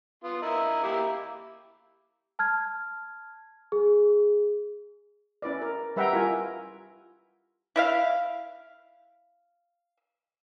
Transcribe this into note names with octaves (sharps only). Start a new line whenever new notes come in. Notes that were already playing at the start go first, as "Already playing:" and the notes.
B3 F4
E4 A#4 D#5
A#3 E4 G4
A5 F6 G#6
G#4
C#4 E4 B4 D5
A#4
G3 B4 E5 F#5 G5 A#5
E4 F4 A#4 G#5
E4 E5 F5